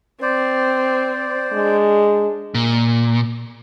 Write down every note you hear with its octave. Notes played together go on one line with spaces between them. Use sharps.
C4 C5 D5
G#3 D4
A#2